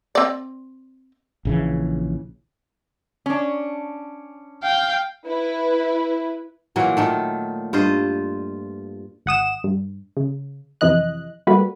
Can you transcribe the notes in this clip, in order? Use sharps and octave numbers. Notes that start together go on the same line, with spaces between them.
C4 D5
A#1 C#3 E3
C#4 D4
F5 G5
E4 B4
A#2 E3 F#3 A#3
A#2 D#3 A3
G2 F4 C5 D#5
G#1 F#5 D#6 E7
G2
C#3
F2 C3 E3 D#5 F#6
G3 A3 A#3 F#4 B4